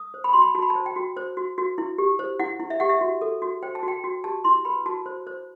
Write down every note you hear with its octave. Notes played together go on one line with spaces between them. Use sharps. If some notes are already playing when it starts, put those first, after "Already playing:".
Already playing: D#6
C5
B5
F#4 C6
B5
F#4 A5
B5
A5
C5
G5
F#4
C5
F#4
F#4
E4
G4
C5
E4 F#5
E4
E5
G4 F#5
E5
F#4
A4
F#4
C5 G5
A5
F#4
G5
F#4
G4 A5
E4 C6
B4 B5
F#4 A5
C5
C5